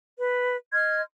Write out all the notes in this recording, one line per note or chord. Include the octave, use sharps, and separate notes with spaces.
B4
D#5 C6 F6 G#6